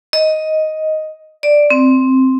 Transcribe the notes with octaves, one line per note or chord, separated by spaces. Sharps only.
D#5
D5
C4